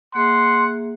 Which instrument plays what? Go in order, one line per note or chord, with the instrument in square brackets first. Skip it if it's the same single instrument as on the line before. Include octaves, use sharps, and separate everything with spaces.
[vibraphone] A#3 G#4 E5 [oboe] F#5 [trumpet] C6